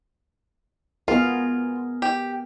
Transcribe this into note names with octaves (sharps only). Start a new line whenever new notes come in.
B3 F4 G#4 A#4
G4